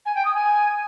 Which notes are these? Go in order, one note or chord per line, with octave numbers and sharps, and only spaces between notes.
G#5
G5
D#6
G#5